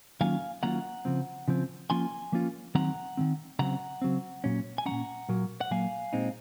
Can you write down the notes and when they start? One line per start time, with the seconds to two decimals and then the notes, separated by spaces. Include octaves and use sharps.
0.21 D#3 F#3 A#3 C#4 F4 F5 G#5
0.63 D#3 F#3 A#3 C#4 F4 F#5 A#5
1.05 C#3 F3 C4
1.48 C#3 F3 C4
1.90 F3 A#3 C#4 F4 G#5 C6
2.32 F3 A#3 C#4 F4
2.75 D#3 F#3 C4 F#5 A#5
3.17 D#3 F#3 C4
3.59 C#3 F#3 C4 F#5 A#5
4.02 C#3 F#3 C4
4.44 A#2 F#3 C#4
4.78 G#5
4.86 F#3 C#4 F#5 A#5
4.91 A#2
5.29 A#2 F#3 A#3
5.61 F#5
5.71 A#2 F#3 A#3 F5 G#5
6.13 A#2 G#3 C4 D#4